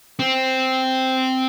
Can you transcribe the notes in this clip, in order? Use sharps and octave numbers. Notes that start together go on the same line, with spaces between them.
C4